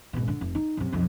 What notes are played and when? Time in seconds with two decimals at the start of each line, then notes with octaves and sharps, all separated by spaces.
0.13 G#1 B2
0.28 D3
0.41 F1
0.55 D#4
0.77 F#2 C3
0.92 B1 F2